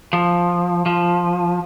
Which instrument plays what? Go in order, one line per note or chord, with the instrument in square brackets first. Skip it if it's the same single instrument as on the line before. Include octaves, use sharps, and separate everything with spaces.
[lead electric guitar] F3
F3